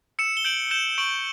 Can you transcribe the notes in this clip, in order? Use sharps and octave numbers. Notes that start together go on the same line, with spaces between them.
E6 C#7 E7
G7
G6 D7 F#7
G6 E7 G7
C#6 D7 F#7